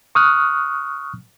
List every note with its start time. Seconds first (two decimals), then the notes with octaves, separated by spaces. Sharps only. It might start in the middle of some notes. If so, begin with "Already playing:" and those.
0.15 C#6 D#6 F6 F#6